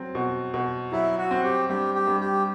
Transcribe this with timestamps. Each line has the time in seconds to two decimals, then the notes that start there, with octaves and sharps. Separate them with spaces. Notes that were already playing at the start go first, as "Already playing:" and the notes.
Already playing: F#3 C4
0.15 B2
0.54 B2
0.92 F#3 E4
1.18 F#4
1.31 C4
1.43 G4
1.69 G2 G4
1.94 G4
2.07 G2
2.20 G4